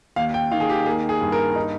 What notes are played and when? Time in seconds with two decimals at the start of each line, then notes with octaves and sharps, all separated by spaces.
0.16 D#2 F5
0.34 G5
0.52 D#3 F5
0.60 G#4
0.69 G4
0.86 A#3 G#4
1.09 G#4
1.21 G2
1.32 A#4
1.56 D#4